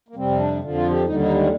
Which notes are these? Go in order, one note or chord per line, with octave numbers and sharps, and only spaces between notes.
A#3
F2 C3 G3 C4
D4
F2 D3 F3
F4
G4
D#2 D3 G3 D#4
D#4
G#3